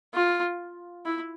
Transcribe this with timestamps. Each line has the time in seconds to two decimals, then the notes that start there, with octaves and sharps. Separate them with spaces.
0.14 F4
1.05 E4